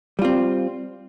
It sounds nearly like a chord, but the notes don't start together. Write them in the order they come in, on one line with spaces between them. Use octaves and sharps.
G3 F4 C4